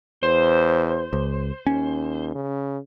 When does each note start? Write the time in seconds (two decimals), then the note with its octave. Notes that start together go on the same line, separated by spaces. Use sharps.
0.23 E2 C5
1.13 C#2
1.67 D#2 C#4
2.35 C#3